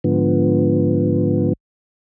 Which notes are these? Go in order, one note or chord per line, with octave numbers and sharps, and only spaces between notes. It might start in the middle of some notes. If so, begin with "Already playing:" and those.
G#2 D3 F3 B3